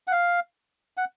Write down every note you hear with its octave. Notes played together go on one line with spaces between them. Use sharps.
F#5
F5
F#5